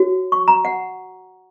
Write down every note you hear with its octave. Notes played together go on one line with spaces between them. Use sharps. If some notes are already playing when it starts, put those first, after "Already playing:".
Already playing: F#4 C#5
C#6
A#5
F#5